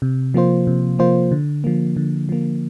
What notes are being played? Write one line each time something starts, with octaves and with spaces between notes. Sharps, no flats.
C3
F3 A#3 F4 C5
C3
F3 A#3 F4 C5
D3
F3 A#3
D3
F3 A#3